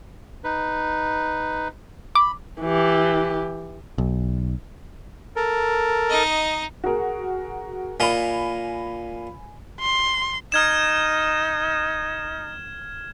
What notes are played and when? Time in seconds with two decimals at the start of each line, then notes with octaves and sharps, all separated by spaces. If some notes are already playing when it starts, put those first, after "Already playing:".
0.44 D#4 B4
2.15 B5 D6
2.62 E3 G4
3.98 B1
5.36 A4 A#4
6.10 D#4 D#5
6.84 F#4 G#4 A#4
8.00 A#2 A#4 D#5 G#5 B5
9.80 C6
10.52 D#4 F6 G#6 E7